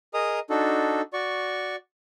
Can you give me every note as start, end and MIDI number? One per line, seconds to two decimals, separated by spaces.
0.14 0.40 68
0.14 0.40 70
0.14 0.40 75
0.14 0.40 82
0.14 0.40 87
0.50 1.02 62
0.50 1.02 63
0.50 1.02 66
0.50 1.02 69
1.13 1.76 66
1.13 1.76 74
1.13 1.76 85